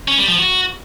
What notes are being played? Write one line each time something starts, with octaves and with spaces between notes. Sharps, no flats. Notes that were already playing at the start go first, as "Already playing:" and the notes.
C#4
G3
F3
F#4